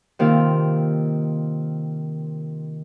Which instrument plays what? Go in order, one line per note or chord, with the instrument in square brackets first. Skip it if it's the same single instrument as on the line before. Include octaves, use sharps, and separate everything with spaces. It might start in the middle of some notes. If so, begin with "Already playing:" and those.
[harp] C3 D#3 A#3 F4